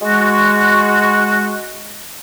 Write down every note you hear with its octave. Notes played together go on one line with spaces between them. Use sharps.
G#3 F#4